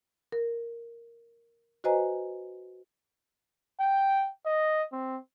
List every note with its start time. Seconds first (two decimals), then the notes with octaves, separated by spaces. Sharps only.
0.32 A#4
1.84 F#4 B4 C5 D#5 G#5 A#5
3.81 G5
4.46 D#5
4.93 C4